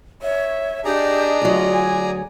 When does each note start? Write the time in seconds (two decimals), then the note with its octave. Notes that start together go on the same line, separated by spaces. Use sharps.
0.22 C#5 E5
0.85 D4 G4 G#4 D5 D#5 A#5
1.42 D2 F#3 F4
1.73 G#5